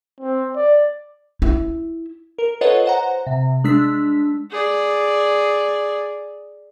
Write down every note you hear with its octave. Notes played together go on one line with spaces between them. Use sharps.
C4
D5
E4
A#4
F4 A4 B4 C#5 D#5 F#5
C5 F#5 A#5
C3
G#3 D4 E6 B6
G#4 D5